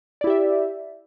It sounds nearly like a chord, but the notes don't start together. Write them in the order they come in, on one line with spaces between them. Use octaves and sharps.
D5 E4 G4 E5